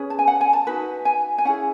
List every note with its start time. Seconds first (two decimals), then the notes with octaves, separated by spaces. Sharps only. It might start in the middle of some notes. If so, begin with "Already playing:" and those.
Already playing: C#4 G#4 B4
0.10 A5
0.19 G#5
0.27 F#5
0.41 G#5
0.53 A5
0.67 D#4 F#4 B4
1.05 G#5
1.38 G#5
1.45 C#4 E4 G#4 F#5